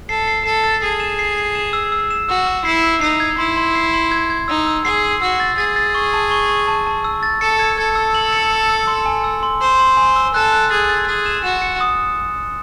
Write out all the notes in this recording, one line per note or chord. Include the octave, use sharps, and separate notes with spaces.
A4 C7
C7
A4 C7
A6
G#4 C7
E7
C7
C7
E7
E6
E6
E7
F#4 E6
E6
E4 C7
E6
D#4 C7
G#6
E4 C6
C6
C7
C6
G#6
G#6
D#4 E6
E6
G#4 C7
C7
F#4 E6
A6
G#4 A6
A6
C#6
A5
C#6
C#6
A5
A5
E6
A6
A4 C#7
G#6
A4 G#6
E6
F#7
C#7
C#7
E6
C6
G#5
E6
C6
C5 C6
C6
G#5
E6
A4 F#6
F#6
G#4 A6
A6
G#4 A6
E7
F#4 E7
C#7
D#6